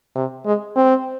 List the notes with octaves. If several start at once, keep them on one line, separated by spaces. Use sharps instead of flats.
C3
G#3
C4